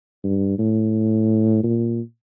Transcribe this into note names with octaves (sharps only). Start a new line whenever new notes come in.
G2
A2
A#2